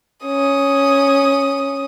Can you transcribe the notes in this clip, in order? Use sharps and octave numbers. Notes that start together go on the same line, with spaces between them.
C#4 D#6